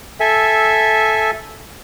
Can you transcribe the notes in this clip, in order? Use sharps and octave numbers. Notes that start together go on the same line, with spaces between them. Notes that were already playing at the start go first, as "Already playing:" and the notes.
A4 E5 G#5